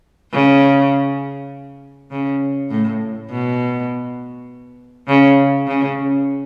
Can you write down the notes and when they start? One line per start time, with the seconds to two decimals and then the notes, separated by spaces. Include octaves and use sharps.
0.32 C#3
2.11 C#3
2.70 A2
3.30 B2
5.08 C#3
5.67 C#3